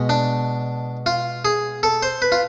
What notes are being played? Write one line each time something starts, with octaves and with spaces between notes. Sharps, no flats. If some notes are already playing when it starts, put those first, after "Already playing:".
Already playing: B2 G#3
D4
F4
G#4
A4
C5
B4
F4